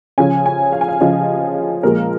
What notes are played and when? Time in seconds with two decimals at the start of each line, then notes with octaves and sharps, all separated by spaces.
0.18 C#3 F3 C#4 G#5
0.46 G#5
0.72 F5
0.81 G#5
0.88 F5
1.00 C#3 F3 C#4 D#5
1.83 A#2 F3 G#3 A#4